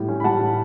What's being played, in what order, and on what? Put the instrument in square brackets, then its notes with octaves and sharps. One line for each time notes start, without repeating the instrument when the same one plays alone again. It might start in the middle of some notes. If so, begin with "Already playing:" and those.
Already playing: [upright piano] A2 G3
C#4
B5
G3 F#5 A5
A2